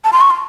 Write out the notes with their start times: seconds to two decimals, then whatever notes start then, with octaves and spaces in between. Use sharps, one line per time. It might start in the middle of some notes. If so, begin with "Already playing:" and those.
0.04 A5
0.13 C6
0.21 C#6
0.30 C6